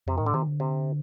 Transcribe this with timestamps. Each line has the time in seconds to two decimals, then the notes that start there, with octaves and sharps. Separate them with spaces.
0.07 F2 C3
0.18 A2 D#3
0.26 D3
0.34 C3 D#3
0.47 D3
0.60 C3